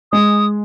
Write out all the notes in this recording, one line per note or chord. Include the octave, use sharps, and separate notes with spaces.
G#3 D#6